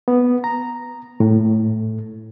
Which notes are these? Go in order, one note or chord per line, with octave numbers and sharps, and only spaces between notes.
B3
A#5
A2